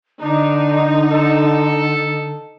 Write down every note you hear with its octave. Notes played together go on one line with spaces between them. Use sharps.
D3 D4 D#4
A4